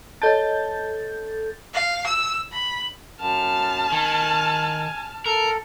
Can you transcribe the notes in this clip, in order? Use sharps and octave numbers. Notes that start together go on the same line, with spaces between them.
A4 C#5 D#5 A5 G6 A6
F5
E6
B5
F#2 A5 F6
D#3 G#5
A4 A#4